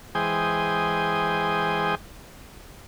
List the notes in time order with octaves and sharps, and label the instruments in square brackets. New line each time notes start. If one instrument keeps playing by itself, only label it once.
[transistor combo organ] E3 G#3 C5 G5 G#5 D#6